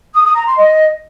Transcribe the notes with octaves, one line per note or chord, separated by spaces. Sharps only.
D#6
D#6
A#5
C6
D#5